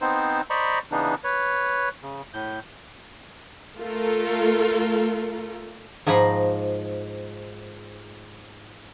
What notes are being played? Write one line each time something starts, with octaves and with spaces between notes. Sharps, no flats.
B3 C4 D#4 C5
C5 D5 D#5 A#5 B5 C#6
C#3 E3 B3 D4 D#4
B4 C#5
C#3
A2 G6
A3 F4 A4 A#4
G#2 F3 G#5 A#5 B5